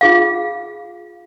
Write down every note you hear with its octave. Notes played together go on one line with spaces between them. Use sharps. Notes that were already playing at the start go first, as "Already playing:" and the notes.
F4 G#4 F5